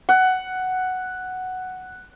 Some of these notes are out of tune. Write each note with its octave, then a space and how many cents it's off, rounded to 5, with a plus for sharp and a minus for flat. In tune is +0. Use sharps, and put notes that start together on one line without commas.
F#5 +5